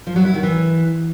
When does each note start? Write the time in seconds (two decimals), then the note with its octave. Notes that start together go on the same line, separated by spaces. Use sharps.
0.07 F3
0.16 F#3
0.25 E4
0.34 D#3
0.43 E3